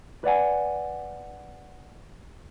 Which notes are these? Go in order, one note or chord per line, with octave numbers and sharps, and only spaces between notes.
B4 D5 F#5 G#5